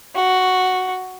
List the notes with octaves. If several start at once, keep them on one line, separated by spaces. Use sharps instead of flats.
F#4